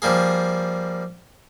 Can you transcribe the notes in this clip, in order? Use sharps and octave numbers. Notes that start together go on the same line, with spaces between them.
F3 G3 A#3 G#4